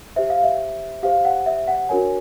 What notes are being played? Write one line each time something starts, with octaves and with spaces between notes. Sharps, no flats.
G4 C5 E5
F5
E5
G4 C5 F5
F#5
E5
F#5
D4 F#4 A#4 C#5 G#5